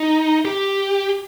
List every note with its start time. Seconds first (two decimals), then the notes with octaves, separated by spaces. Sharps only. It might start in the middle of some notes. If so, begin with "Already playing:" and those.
Already playing: D#4
0.45 G4